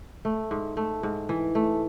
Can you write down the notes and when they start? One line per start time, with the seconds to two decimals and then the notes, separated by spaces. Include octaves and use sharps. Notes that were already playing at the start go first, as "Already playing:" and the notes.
0.25 A3
0.51 G#2
0.77 A3
1.03 G#2
1.29 E3
1.55 A3